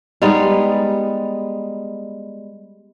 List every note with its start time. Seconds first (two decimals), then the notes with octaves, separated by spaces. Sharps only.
0.22 G3 G#3 B3 D#4